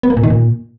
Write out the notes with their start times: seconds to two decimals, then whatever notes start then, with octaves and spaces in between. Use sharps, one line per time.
0.03 B3
0.10 A#3
0.17 A#2
0.23 D#3
0.30 A#2